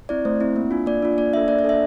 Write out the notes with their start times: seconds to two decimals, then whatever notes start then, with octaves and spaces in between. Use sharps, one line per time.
0.09 C4 E4 D5
0.25 A3 C5
0.41 C4 E4
0.56 A#3
0.71 D4 F4
0.86 A#3 D5
1.02 D4 F4
1.18 A#3 D5
1.33 D4 E5
1.37 A4
1.48 A#3 D5
1.59 D5
1.64 D4 A4 E5